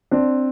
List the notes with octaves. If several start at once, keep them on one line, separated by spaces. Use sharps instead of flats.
C4 D4